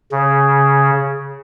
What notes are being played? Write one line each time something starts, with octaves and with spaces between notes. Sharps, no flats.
C#3